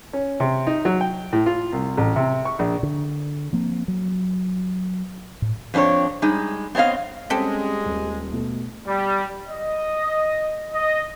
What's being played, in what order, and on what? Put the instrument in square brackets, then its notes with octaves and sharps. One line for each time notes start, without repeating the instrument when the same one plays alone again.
[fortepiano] C#4
C3
D#4
F#3
G5
A2
F4
C2
A1
C3
C#6
A#1
[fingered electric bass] D3
F3 A#3 C4
F#3
A2
[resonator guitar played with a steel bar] F2 C4 D4 E4 C#5
G3 G#3 D#4
B3 C4 C#5 D#5 F5
[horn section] G3 G#3 [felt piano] C4 C#4 [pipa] G4 A4
[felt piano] D#1
B2 A3
[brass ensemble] G3
D#5
D#5